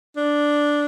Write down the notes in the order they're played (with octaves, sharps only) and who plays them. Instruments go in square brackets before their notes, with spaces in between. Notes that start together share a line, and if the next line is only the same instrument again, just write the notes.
[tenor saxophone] D4